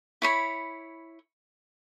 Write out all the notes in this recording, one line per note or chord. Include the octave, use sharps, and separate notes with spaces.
E4 C#5 B5